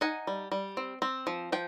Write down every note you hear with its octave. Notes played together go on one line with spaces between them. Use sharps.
D#4 F#5 G#5
G3
G3
C4
C4
F3
F3 G5